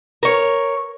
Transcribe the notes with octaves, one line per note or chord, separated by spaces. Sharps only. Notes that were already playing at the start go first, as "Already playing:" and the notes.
A#4 C#5